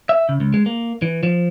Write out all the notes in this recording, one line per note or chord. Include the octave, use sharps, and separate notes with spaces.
E5
C#3
C#2
G#3
A#3
E3
F3